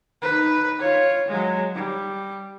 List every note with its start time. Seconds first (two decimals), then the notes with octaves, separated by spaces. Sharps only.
0.22 D#4 B4
0.79 F4 C#5
1.28 F#3 G#3
1.75 G3